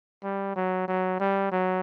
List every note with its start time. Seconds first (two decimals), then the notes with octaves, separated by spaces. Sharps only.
0.23 G3
0.56 F#3
0.88 F#3
1.20 G3
1.52 F#3